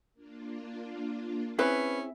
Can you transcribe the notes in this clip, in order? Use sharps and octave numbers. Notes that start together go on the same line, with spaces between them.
A#3 D4 F4
C4 C#4 E4 G#4 B4